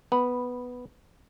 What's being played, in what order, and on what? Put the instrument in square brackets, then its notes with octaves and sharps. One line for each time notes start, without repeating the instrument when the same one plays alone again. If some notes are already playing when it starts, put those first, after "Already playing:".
[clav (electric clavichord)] B3 [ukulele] B5